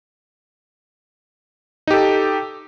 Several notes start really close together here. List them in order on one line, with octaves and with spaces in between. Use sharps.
D#4 G4 A4